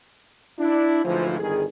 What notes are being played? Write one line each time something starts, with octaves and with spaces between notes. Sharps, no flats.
D4 E4
D2 G#2 E3 F3
G1 D#3 G3 G#4